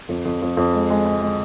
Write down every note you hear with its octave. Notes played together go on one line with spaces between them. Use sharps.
F2
F2
F2
F2
G#3
G#3
G#3
G#3